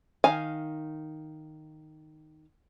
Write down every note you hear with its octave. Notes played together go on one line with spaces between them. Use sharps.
D#3 F5 G#5